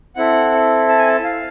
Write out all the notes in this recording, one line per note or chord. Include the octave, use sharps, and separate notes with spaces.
C4 E4 A4 F#5
A5
G#5
A5
F5